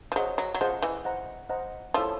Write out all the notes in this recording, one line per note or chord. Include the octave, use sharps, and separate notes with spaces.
F3
F#3 G#4 C5 D#5 F#5
F#3
F#3
F3 G#4 C5 D#5 F#5
E3
C5 D#5 F#5 A#5
C5 D#5 F#5 A#5
F3 E4 A4 C#5 E5 A5